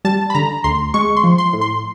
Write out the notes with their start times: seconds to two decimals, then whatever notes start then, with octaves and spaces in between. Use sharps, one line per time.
0.05 G3 A5
0.30 B5
0.35 D3 A#5
0.64 D2 C6
0.94 G#3 C#6
1.17 C6
1.24 F3
1.38 C6
1.53 A2
1.61 C6